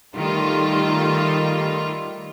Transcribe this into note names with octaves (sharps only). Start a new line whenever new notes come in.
D#3 G3 A3 F4